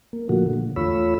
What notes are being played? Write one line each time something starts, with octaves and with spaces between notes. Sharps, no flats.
A#3
A#2 D3 F3 A3 A#3 F#4
D3
E2 A3 F4 C#5 B5 E6